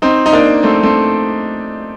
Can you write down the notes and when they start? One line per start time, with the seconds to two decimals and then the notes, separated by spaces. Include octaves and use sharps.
0.02 C4 D#4
0.26 D#4
0.33 A#3 D4
0.63 A3 C4
0.83 A3 C4